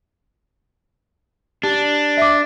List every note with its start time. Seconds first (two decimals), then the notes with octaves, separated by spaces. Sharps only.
1.63 D4 G4
2.17 E5 D6